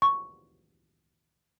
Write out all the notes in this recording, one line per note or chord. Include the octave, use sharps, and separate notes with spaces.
C#6